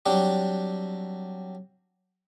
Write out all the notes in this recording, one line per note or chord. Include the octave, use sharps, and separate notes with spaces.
F#3 G3 C4 D4 G4